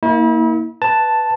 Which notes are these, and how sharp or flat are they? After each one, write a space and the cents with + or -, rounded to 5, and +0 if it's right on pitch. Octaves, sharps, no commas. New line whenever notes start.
A#3 +0 E4 -40
B4 +0 A5 +0